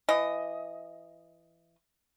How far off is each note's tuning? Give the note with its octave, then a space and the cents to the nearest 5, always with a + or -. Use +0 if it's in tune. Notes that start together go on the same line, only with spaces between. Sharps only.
E3 +25 D#5 +5